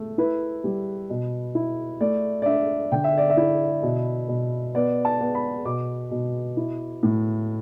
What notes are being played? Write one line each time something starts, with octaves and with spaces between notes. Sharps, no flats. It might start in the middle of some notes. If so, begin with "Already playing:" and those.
Already playing: A3
E4 B4
G3
B2
E4
A3 D5
D5
D4 E5
D3 G5
E5
D5
E5
E4
B2
B2
B3 D5
A5
B3
B5
B2 D6
B2
E4
A2